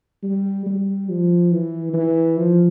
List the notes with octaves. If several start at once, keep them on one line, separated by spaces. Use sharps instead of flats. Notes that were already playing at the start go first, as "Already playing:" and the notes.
G3
G3
F3
E3
E3
F3